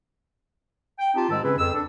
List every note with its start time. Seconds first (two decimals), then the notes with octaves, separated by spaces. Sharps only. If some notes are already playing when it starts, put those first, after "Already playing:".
0.99 G5
1.15 C4 D#4 F4 G4 A5
1.29 G#2 D#3 G#3 A5 E6
1.43 C#3 C4 C#4 G#4 B4
1.58 F2 E6
1.74 D4 A4